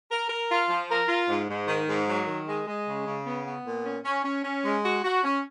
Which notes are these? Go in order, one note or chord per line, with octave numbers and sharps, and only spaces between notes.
A#4
A#4
F4
F3
A#4
F4
G#2
G#2
D#3
G#2
F#3
D#3
G#3
G#3
C#3
C#3
B3
B3
A#2
C#4
C#4
C#4
C#4
G#3
F#4
F#4
C#4